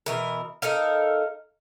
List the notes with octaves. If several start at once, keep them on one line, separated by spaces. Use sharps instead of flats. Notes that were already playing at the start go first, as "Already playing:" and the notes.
B2 E3 A#4
D#4 A4 A#4 F5